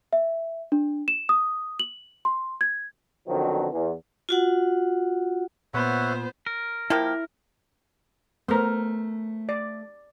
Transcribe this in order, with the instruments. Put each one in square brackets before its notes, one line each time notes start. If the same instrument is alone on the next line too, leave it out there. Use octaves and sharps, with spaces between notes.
[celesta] E5
D4
E7
D#6
F#7
C6
G#6
[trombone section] F2 B2 D3 D#3 F3 F#3
E2
[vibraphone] F4 F#4 F#5
[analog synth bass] A#2 [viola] B3 C5 [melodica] C#5 E5 F#5
[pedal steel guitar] A#4
[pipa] F3 A#3 G4 [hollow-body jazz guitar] E4
[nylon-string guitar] A3 C5 [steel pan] B3 A#4
[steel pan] D5